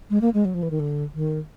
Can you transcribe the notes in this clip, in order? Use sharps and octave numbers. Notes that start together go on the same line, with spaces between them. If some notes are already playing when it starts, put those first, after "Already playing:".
G#3
A#3
G#3
F#3
F3
E3
D#3
D3
D#3